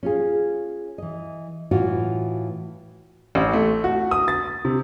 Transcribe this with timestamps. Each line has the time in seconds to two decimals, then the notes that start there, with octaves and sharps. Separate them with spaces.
0.03 C#4 F4 G#4
0.98 E3 D#5
1.71 A2 E3 F4 F#4
3.35 A1
3.53 A3
3.84 F#4
4.11 D#6
4.28 A6
4.65 C3